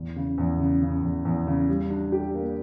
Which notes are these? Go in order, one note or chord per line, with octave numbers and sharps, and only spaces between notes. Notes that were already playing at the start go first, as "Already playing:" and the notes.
Already playing: E2
C#3
E2
C#3
C#3
E2
E2
C#3
G3
D4
G4
A#3